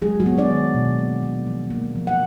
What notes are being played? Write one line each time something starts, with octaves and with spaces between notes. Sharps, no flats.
F#3 G#3 G#4
F#3 F#4
B3
D4 D5
D#3
B2
A#3
F#3
F3
A#3
F3
F#5